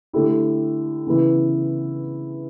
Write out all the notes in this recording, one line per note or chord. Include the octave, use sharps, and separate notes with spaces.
D3 A3 E4 G4
C#3 E3 B3 E4